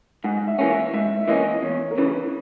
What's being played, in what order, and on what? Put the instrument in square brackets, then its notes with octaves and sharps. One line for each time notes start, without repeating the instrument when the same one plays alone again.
[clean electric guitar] G#2 [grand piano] F#5
[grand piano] E5
[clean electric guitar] E3 A#3 C#4
[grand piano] E5
[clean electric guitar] G#2 [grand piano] E5
[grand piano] E5
[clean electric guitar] E3 A#3 C#4 [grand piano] D#5
[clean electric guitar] E2 [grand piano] C#5
[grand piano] A#4
[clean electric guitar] C#3 E3 [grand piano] B4